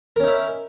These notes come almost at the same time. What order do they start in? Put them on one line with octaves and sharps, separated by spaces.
A#4 C#4 D#4 E4